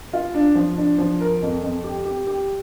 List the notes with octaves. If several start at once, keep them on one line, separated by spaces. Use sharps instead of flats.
F4
D4
F3
D4
F3
A#4
F2
F2
G4
G4
G4